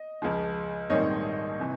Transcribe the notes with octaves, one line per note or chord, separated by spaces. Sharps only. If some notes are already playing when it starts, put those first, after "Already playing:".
Already playing: D#5
C#2 C#3 F3 G#3
A#1 G#2 D#3 G3 C4 C#5 D#5
C3 E3